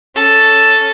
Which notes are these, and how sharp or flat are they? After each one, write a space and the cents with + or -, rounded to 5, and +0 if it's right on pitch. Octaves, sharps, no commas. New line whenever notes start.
C#4 +5 A4 +0